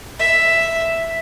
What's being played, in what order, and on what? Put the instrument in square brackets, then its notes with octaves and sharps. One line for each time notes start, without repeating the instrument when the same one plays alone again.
[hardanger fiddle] E5